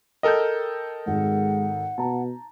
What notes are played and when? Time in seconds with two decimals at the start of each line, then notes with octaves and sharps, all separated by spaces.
0.23 A4 A#4 D#5 G5 G6
1.07 G#1 G#3 F#5
1.98 B2 A5 A#5